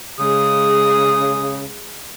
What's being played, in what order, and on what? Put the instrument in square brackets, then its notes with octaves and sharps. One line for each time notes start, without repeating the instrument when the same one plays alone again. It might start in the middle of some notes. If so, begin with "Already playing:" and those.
[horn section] C#3 [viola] G#3 [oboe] D#6